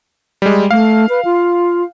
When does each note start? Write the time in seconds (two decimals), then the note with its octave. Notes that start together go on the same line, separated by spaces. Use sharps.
0.42 G3 G#3
0.71 A3 F5
1.09 B4
1.25 F4